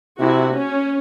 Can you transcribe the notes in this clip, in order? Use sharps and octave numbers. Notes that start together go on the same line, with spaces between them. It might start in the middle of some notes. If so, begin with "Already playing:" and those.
C3 E4 F#4
C#4